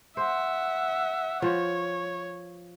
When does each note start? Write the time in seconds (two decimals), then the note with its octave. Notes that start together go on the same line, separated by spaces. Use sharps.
0.17 C5 E5 F#5
1.42 F3 C#5